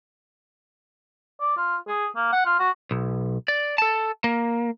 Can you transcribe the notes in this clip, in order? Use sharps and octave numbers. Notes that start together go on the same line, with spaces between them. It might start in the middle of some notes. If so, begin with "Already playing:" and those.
D5
F4
G#4
A#3
F#5
F4
F#4
B1
D5
A4 A5
A#3